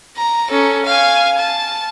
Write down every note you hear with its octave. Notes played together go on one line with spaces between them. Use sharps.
A#5
C#4 A4
F5 G#5
A5